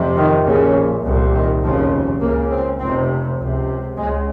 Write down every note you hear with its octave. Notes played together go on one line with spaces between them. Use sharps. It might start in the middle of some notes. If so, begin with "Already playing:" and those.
Already playing: F1 F2 C3
D#3
A#1 A#2 C#3
C2 A#2
D#3
F1 D#2 C#3 F3
C#2 C#3 A#3
C4
F1 F2 C3 C4
C#2 C3
C#2 C#3 G#3